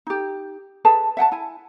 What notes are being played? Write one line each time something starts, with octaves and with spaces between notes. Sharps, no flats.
D#4 G4
G#4 A4 B4 A5
E5 F#5 G5 A5
E4 G#5